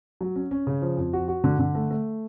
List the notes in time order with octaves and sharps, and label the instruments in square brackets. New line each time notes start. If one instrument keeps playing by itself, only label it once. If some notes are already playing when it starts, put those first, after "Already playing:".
[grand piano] F#3
C#4
C#4
C#3
F3
F2
F#4
F#4
D3
D3
A3
A3